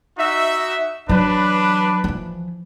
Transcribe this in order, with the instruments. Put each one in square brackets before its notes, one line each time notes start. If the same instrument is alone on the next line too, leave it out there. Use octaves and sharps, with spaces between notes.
[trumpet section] D#4 F#4 E5
[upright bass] E3 F#3 [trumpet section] D4 B4
[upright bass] E3 F3